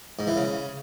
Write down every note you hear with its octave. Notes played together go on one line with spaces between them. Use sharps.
G#2
E3
C#3